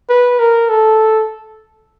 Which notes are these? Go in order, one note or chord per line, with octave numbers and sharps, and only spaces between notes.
B4
A#4
A4